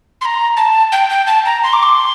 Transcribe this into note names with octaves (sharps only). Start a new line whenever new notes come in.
C6
A#5
A5
G5
G5
A5
A#5
C6
D6
C6